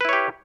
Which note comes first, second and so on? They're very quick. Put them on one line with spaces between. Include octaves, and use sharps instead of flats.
B4 E4 C#5 G4